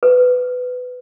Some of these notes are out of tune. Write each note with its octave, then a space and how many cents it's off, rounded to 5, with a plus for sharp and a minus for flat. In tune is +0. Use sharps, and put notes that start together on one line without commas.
B4 +15